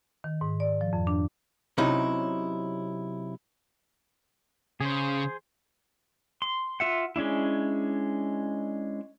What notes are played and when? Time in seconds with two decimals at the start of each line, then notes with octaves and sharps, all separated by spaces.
0.24 D#3
0.41 G#2
0.60 D5
0.81 F3
0.93 F2
1.07 D4
1.78 C3 F#3 C#4 D#4 E4
4.81 C#3 G#4 C5
6.42 C6
6.80 F4 E5 F#5
7.16 G#3 C#4 D4 E4